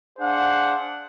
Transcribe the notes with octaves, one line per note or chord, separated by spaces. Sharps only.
D4 G#4 C5 F5 F#5